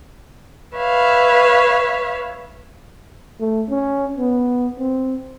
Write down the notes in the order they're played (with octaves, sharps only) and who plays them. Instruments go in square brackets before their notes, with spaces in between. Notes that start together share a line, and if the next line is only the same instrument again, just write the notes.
[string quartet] B4 C#5 E5 F5
[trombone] A3
C#4
B3
C4